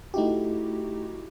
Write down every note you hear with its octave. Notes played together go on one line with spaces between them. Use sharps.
A3 D#4 E4 F#4 G4